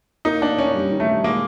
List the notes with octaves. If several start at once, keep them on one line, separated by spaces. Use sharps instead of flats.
A#3 D#4
A#3 D4
C#4 D4
G3
D#3
A3
G3
G#3 A#3